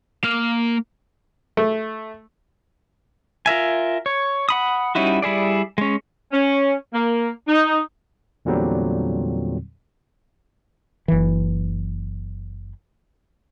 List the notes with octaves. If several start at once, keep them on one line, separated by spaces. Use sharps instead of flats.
A#3 F5
A3
F4 A#4 E5 G#5
C#5
F#5 B5 D#6
G3 C#4 D#4 E4 F#4
G3 E4 G#4 D5
G#3 C#4
C#4
A#3
D#4
E2 A#2 D3 F#3 G3 C4
F#1 E3